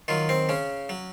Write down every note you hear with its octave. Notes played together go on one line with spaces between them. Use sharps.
D#3 F#3 F4
C4
C#3 C#4
F#3